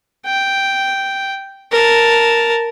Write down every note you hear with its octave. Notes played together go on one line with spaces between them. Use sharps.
G5
A#4 A5